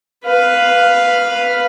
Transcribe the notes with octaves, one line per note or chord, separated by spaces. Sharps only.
B4 F5